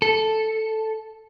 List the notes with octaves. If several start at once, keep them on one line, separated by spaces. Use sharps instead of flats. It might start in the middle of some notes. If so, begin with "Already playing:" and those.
A4